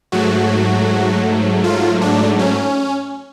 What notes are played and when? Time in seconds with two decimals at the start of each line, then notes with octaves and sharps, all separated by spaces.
0.12 G#2 F#3 A3 F#4
1.64 F4
2.02 D4
2.39 C#4